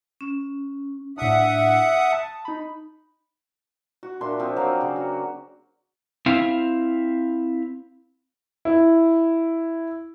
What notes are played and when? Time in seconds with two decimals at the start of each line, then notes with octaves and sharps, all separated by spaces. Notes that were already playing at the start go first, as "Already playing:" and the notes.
0.21 C#4
1.18 A2 D4 E5 F#5 D#6
2.12 A5
2.45 D#4 B5
4.03 F#4
4.21 A#2 D4 E5 C6
4.40 F3 C4
4.56 F#3 A#3 F5 G5
4.81 C#3
4.96 F#4
6.26 C4 E4 F5
8.65 E4